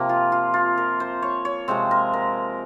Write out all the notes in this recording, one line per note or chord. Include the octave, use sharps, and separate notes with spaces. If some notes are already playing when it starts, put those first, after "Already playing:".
Already playing: C3 F3 A#3
F4
F4
F4
A#4
C5
C#5
C#5
C3 F3 G#3 C4 C5
A#4
A#4